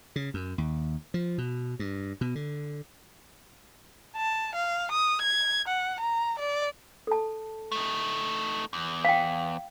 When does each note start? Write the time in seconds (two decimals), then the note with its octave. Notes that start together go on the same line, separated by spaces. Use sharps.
0.16 C#3
0.34 F#2
0.58 D#2
1.14 F3
1.38 B2
1.79 G2
2.21 B2
2.35 D3
4.16 A5
4.55 F5
4.92 D#6
5.21 G#6
5.68 F#5
6.00 A#5
6.39 D5
7.07 A4 A5
7.72 A3 D#4
8.73 E2
9.05 F5 G5